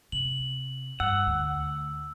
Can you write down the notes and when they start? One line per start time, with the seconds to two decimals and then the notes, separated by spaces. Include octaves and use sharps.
0.12 C3 F#7
1.00 G2 F#5 E6
1.27 D2